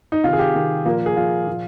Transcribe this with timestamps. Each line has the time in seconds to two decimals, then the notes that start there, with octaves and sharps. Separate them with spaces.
0.12 D#4
0.24 C3 D#3 F4
0.33 G#4
0.39 G4
0.55 C3 D#3
0.86 A#2 F3 A#3
1.06 G#4
1.16 A#2 F3 F4
1.47 A#2 F3